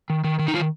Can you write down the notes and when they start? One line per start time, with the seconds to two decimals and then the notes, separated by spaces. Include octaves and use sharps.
0.10 D#3
0.24 D#3
0.39 D#3
0.48 D#4
0.54 D#3 F4